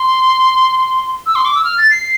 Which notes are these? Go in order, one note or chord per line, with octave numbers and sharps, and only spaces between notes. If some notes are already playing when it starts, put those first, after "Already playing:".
Already playing: C6
E6
C6
D6
E6
F6
A6
C7